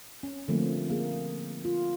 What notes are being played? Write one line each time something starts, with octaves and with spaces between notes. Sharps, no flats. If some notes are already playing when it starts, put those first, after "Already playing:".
C#4
D3 F3 G3 A3 A#3 C4
A#3 G#4
F4